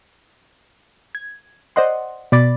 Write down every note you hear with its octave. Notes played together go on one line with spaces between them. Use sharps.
G#6
C5 D5 D#5 F#5 C6
B2 D5 B5 D6 A6